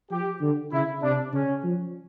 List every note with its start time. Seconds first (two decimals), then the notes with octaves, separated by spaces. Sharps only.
0.11 F3 G4
0.42 D3
0.72 C#3 E4
1.02 C3 D4
1.33 C#3 C#4
1.64 F3